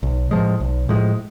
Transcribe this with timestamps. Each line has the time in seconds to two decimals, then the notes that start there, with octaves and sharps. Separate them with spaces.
0.03 B1
0.31 A2 F3 G#3
0.60 B1
0.89 A2 F3 G#3